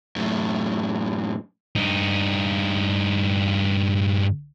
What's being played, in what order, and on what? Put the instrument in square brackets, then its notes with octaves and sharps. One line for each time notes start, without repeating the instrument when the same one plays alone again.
[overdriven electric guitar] F#2 A2
[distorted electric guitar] G2 D#4